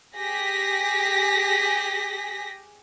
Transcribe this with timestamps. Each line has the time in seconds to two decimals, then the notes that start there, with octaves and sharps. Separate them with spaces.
0.15 G4 G#4 A#6 B6